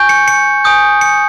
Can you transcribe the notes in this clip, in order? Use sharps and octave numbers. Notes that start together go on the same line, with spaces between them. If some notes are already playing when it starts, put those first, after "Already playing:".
Already playing: G#5 C#6 G6
C#7
C#7
G#5 D#6 G6
C#7